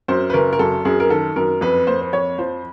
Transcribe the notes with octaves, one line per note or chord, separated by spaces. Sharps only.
F#2 C5
B4
F#1 A#4
A#4
F#2 A4
F#2 G#4
A#4
D#3 A4
F#2 A#4
F2 B4
A#3 C5
C5
F2 C#5
F3 C5